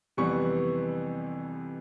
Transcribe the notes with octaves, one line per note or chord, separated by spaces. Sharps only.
F2 C3 E3 G3 B3 C#6